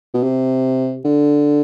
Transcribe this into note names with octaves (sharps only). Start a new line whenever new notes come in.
B2
C3
D3